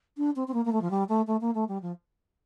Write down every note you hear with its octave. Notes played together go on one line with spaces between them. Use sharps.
D4
C4
C4
A#3
A#3
A3
F3
G3
A3
A3
A#3
A3
G3
F3